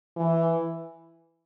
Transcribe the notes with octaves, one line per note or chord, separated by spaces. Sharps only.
E3